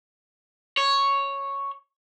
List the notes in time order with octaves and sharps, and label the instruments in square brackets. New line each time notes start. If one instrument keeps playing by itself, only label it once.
[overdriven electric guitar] C#5